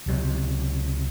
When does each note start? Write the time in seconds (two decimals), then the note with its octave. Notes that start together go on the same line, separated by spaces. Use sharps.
0.06 C#2 C3 F#3